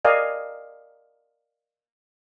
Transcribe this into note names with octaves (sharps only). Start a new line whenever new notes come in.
A#4 D5 D#5 F5 G#5